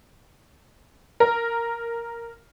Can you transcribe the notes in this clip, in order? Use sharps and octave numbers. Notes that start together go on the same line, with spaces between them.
A#4